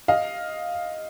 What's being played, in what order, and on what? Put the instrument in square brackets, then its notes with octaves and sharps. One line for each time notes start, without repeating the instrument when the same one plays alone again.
[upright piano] D#5 F5